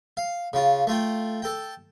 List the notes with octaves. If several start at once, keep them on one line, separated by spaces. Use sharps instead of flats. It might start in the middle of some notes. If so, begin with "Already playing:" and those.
F5
C#3 F4
A3 F4 G5
A4 G5